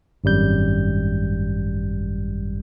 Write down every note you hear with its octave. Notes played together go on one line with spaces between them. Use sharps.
G#1 F#2 G3 G6